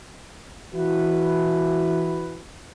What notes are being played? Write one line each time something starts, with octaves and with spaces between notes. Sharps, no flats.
E3 E4 F#4 B4